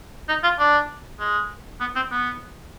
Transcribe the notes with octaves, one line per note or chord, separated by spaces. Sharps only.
D#4
F4
D4
G#3
B3
C4
B3